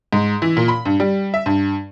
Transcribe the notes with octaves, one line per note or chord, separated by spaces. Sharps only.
G#2
E3
A#2
B5
G2
G3
E5
G2